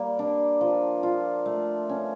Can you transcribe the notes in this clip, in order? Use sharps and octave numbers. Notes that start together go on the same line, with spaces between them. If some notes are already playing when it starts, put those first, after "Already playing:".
Already playing: G3 A#3
D4
F3
F4
A3
C#4